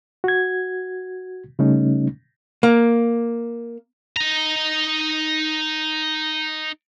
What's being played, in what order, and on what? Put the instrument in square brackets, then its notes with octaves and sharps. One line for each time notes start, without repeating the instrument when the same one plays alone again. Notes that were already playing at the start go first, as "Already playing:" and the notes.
[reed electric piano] F#4 G#6
C#3 G3 A3 C#4 D#4
[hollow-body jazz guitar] A#3
[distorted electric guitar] D#4 A#5